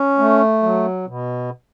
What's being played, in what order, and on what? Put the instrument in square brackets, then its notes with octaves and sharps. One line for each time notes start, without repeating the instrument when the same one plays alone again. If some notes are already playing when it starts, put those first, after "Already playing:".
Already playing: [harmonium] C#4
A3
F#3
B2